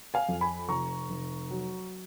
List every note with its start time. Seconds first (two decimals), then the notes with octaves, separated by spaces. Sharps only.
0.14 F5 G#5
0.29 F2
0.41 G#5 B5
0.68 F1 A#5 C#6
1.10 F1
1.51 F#3